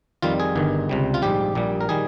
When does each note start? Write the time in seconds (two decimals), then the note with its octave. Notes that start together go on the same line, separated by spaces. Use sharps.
0.22 F2 D#3 G3 F4
0.40 G#4
0.56 G1 G2 D#3
0.89 C#2 C3 G3
1.14 F4
1.22 A#1 G#2 G3 G4
1.55 A#1 A#2 G3
1.81 A#4
1.89 D#3 G3 G#4